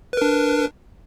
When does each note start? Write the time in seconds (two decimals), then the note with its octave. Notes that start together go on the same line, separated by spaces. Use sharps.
0.13 B4
0.17 A#4
0.22 D4